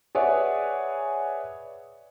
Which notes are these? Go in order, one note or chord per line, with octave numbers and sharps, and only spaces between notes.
G#4 B4 C#5 D5 E5 F#5